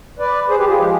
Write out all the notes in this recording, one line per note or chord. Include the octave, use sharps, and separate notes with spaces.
B4 D5
G#4 C5
G4 B4
F4 G#4
F3 G#3 G4